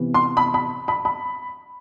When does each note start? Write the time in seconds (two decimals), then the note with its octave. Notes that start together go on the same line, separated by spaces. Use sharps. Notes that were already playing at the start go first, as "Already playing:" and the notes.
Already playing: C3 E3 B3
0.14 C6
0.37 B5
0.54 B5
0.88 B5
1.05 B5